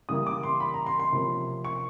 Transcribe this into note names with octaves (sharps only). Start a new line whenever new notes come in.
C#3 E3 G3 A#3 D#6
D6
C6
B5
A#5
C6
C6
C3 F3 A#3 C#4
C#6